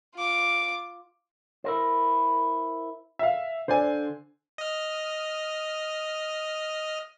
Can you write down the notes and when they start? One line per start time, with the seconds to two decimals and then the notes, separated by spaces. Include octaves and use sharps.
0.15 F4 D6
1.64 E4 A#4 C5
3.19 E5 F5
3.68 D3 C5 D5 G#5
4.58 D#5 F6